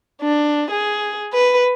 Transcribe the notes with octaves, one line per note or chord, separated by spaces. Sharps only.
D4
G#4
B4